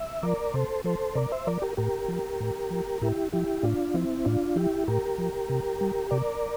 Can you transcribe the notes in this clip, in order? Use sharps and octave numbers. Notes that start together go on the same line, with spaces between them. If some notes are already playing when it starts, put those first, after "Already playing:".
Already playing: E5
F3 A#4 D5
C3 A4 C5
F3 A4 C5
C3 A#4 D5
C5 E5
F3 A#4 D5
G4 A#4
A2 G4 A#4
F3
A2
F3
A2 E4 G4
F3 E4 G4
A2 D4 F4
F3 C4 E4
A2 D4 F4
F3 E4 G4
A2 G4 A#4
F3
C3
G3
C3 A#4 D5